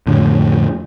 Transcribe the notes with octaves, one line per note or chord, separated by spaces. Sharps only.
F2 A2 D3